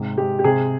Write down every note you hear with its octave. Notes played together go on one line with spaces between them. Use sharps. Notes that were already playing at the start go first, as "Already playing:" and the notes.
Already playing: G#2 C3 G#3
G#3 G4
G4
C3 G#4